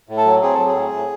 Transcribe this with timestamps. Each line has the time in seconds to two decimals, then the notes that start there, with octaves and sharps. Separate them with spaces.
0.09 A2
0.17 A4
0.26 F#3
0.42 C4 G#4
0.54 F#3 A4
0.67 G#4
0.75 A2
0.92 A2